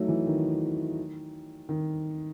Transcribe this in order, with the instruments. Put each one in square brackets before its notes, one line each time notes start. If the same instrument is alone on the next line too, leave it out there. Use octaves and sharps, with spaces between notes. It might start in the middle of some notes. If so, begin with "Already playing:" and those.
Already playing: [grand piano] F#3 A3 D#4
E3
D#3
D#3